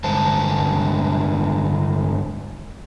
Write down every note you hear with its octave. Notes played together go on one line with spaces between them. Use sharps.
G2 D3 G#3 C5 A5